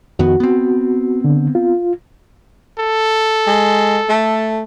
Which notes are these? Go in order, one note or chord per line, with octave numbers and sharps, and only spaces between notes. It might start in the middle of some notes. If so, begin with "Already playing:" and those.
F2 D#3 B3 F#4
B3 C4
D3
F4
A4
G#3
A3